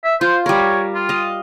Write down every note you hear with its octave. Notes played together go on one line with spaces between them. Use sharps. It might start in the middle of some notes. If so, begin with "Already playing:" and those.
E5
F4 C5
G3 A#4 C#5
F4
D#5 F5